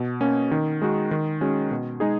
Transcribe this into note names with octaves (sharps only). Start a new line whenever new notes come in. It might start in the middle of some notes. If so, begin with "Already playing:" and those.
Already playing: B2
A#3 C#4
D#3
G#3 D#4 F#4
D#3
G#3 C#4 F#4
B2
G#3 D#4 G#4